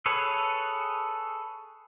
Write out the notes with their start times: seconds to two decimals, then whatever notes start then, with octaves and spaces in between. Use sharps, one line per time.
0.06 G#4 A4 B4 C#5